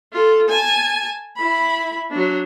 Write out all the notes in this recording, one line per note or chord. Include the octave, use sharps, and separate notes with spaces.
F4 A4
G#5 A5
E4 B5
F#3 D4